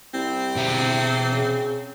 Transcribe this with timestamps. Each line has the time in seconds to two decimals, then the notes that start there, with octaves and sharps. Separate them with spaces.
0.14 C2 C4
0.56 B2 E5 A#5
1.32 C#3